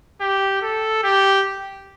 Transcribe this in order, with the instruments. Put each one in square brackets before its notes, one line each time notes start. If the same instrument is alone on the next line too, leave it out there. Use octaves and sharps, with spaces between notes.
[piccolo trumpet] G4
A4
G4